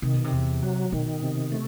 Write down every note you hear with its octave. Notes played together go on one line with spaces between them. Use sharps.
C3 D#3
B2
C3
E2
F#3
B2 D#3
C3
A3